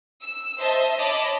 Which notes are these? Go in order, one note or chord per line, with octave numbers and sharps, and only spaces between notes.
E6
C5 D#5 E5 A5
C#5 D#5 A5 B5 D6